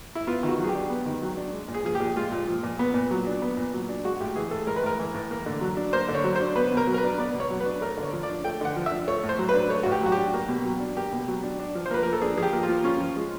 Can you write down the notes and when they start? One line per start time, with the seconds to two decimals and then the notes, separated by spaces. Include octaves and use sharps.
0.15 E4
0.27 B3 F4
0.43 D#3
0.48 F#4
0.59 F#3
0.64 G#4
0.69 G4
0.75 D4
0.90 B3
1.06 D#3
1.22 F#3
1.37 D4
1.53 G#3
1.68 A#2
1.74 G#4
1.85 F3 G#4
1.95 G4
2.00 A#2
2.16 G#3 F4
2.32 A#2
2.48 F3
2.63 A#2
2.79 B3
2.94 A#2
3.11 F#3
3.27 D4
3.42 B3
3.57 A#2
3.74 F#3
3.89 D4
4.04 G#3 F#4
4.20 A2 G4
4.36 E3 G#4
4.51 A2 A4
4.67 G#3 A#4
4.76 B4
4.83 A2 A#4
4.99 E3
5.14 A2
5.31 A#3
5.46 D3
5.61 F#3
5.77 D4
5.93 A#3 C5
6.09 D3
6.15 C#5
6.24 F#3
6.36 D4 C5
6.56 B3 B4
6.72 B2
6.77 A#4
6.87 F#3
6.94 A#4
6.98 B4
7.04 D4
7.18 B3 D5
7.34 B2
7.40 C#5
7.50 F#3
7.60 B4
7.66 D4
7.81 A3 A#4
7.97 D3
8.03 C#5
8.13 F3
8.23 D5
8.29 D4
8.44 A3 G5
8.61 D3 F#5
8.76 F3
8.86 E5
8.91 D4
9.08 A3 C#5
9.23 A2
9.29 C5
9.39 F#3
9.49 B4
9.54 D4
9.70 A3 C#5
9.83 A2 F#4
9.91 G4
10.02 F#3 F#4
10.12 D4 G4
10.34 A#3
10.48 B2
10.65 F#3
10.80 D4
10.97 A#3 G4
11.12 B2
11.28 F#3
11.43 D4
11.59 D4
11.75 F3
11.86 C5
11.91 A#3 B4
12.03 F3 A#4
12.13 A4
12.21 D4 G#4
12.38 F3 G#4
12.42 G4
12.53 A#3
12.63 F4
12.69 F3
12.84 C#4 F4
13.00 F3
13.16 G#3